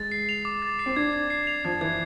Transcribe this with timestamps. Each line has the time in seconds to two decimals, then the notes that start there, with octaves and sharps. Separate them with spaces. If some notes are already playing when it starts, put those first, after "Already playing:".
Already playing: G#3 A6
0.12 C7
0.29 F7
0.45 D6
0.62 A6
0.79 C7
0.86 C4
0.96 D4 G#6
1.13 G#6
1.30 C7
1.47 F7
1.65 F3 G#6
1.81 E3 G#6